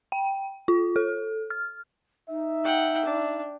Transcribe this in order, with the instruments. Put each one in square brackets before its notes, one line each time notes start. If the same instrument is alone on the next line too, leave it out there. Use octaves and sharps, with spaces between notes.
[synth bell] G5
F4
A4
F6
[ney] D#4 [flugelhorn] E5
[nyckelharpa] F#5 G5
D4